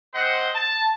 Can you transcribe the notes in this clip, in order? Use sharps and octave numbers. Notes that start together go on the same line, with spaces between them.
C4 G4 C5 D#5 F#5
A5